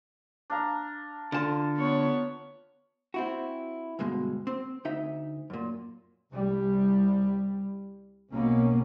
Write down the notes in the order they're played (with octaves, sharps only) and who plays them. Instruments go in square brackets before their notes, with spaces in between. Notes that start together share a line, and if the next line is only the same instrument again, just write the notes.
[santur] D4 F5 A#5
[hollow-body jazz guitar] D3 A5 [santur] F4
[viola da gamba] B3 C#5
[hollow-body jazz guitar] C4 E4 F#4
D2 G2 B2 G#3
C4
D2 D#4 E5
F#2 A#2
[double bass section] C2 G3
B1 B2 A#3 C#4